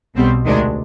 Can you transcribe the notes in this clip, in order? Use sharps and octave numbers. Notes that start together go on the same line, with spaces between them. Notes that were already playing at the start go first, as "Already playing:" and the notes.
B1 B2 G3 C4
D2 C3 D#3 G#3 D4